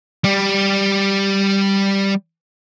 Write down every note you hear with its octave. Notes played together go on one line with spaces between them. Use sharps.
G3 G4